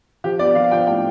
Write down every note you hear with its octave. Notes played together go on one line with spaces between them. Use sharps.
F3 G4
B3 D5
F3 F5
F3 G5
A2 G5